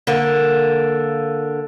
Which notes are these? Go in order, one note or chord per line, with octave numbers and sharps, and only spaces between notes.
D3 A#3